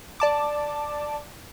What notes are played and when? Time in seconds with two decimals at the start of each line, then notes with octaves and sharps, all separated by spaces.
0.20 D5 A5 D6